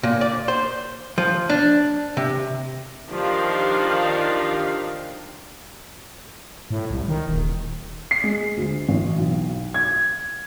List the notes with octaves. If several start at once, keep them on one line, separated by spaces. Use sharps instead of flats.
A#2
D5
C5
F3
D4
C3
D#3 F3 D4 D#4 G4 F5
A2
C2
D#3
D#1
C7
G#3
D2
A1
B1
G#6